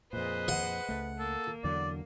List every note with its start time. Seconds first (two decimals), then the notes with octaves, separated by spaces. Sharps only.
0.13 F2 A#2 G#4 B4 C5 D#5
0.48 F#5
0.89 C#2 A3
1.19 A#3 A4
1.64 E2 D3 F#3 D5